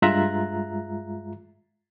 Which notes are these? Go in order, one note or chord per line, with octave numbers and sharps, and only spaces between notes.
G2 G#3 F4 E5 A#5 F#6